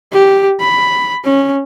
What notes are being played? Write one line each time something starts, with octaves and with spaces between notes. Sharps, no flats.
G4
B5
C#4